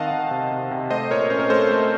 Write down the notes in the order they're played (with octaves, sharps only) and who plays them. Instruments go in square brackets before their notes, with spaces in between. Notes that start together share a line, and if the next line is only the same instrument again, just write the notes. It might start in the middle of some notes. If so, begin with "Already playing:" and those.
Already playing: [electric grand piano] D#3 C4 D#5 F5 F#5 A5
D#3
C3
C3
C3
A3 C5 D#5
A#2 A#4 C#5
C#4 C5
A#4
A3 A4 C5
A3